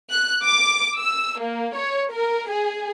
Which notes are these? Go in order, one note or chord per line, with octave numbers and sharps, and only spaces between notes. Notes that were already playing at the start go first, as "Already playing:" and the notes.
F#6
D6
E6
A#3
C#5
A#4
G#4